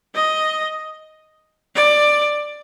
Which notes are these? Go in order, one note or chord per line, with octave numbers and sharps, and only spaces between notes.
D#5
D5